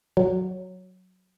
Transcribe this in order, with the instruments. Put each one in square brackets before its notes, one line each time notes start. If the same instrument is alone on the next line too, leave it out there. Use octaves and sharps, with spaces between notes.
[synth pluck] F#3